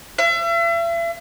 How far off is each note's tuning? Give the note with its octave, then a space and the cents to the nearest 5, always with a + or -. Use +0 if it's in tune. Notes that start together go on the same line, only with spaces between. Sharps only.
E5 +40